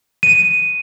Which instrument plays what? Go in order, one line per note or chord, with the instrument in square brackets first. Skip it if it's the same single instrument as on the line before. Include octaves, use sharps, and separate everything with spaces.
[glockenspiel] D#7